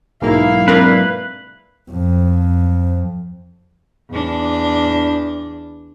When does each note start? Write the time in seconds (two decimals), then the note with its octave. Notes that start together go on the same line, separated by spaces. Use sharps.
0.22 B1 G#2 A#3 E4 F5
0.68 C4 D4 A#4 B4
1.90 F2
4.12 E2 D4